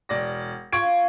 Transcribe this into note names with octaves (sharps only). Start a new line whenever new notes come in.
E1 D5 A#6
F4 D5 C#6 G#6 D7